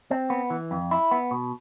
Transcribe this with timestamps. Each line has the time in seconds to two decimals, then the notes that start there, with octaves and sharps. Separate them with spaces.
0.11 C4
0.30 B3
0.50 E3
0.71 F2
0.91 E4
1.11 B3
1.31 B2